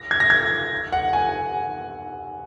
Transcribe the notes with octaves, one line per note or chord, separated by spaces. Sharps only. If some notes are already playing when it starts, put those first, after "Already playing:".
Already playing: A#6
G#6
A#6
G#6
F#5
G#5